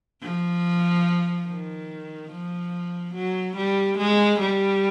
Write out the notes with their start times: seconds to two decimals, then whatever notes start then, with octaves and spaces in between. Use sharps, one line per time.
0.22 F3
1.47 D#3
2.31 F3
3.14 F#3
3.56 G3
3.98 G#3
4.40 G3